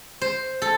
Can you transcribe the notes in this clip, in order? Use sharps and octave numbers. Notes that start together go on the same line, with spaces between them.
C5
A4